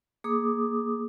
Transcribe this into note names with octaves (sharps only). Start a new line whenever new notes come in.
A#3 G#4 D6 D#6